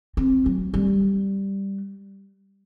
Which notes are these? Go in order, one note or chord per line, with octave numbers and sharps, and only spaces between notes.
C4
F#3
G3